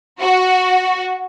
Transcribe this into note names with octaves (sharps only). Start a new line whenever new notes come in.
F#4